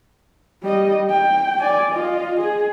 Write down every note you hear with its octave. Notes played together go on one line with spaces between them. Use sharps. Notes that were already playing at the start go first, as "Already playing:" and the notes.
G3 D#5
G5
D5 G#5
F4 D#5
G#4